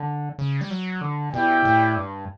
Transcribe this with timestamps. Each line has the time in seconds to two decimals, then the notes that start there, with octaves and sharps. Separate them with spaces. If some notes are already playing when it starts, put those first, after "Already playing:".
Already playing: D3
0.39 C#3
0.61 G3
0.71 F#3
1.01 D3
1.33 B2 E4 G4 D5 G5
1.65 A2
1.97 G2